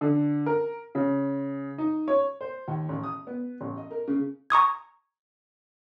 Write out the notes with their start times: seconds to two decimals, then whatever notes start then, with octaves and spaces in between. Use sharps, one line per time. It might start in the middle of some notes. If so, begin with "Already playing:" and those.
0.01 D3
0.46 A#4
0.95 C#3
1.78 D#4
2.08 C#5
2.41 C5
2.68 D#2
2.89 A1
3.03 D#6
3.27 B3
3.61 A1
3.77 D#5
3.91 A#4
4.08 C#3
4.50 A#5 C#6 D#6 G#6